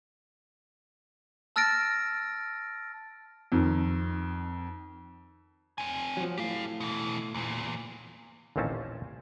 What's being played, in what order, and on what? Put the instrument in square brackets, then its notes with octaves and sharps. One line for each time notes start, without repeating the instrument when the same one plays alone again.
[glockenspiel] A5 E6 F6 A6 A#6 D7
[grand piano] F2 D#3
[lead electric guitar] C4 G#5
[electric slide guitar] F3 F#3
[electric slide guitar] A2 [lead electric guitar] G4 F5
[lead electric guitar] B2 E3
E2 A#2
[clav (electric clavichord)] A1 D#2 A#2 C4 C#4 A5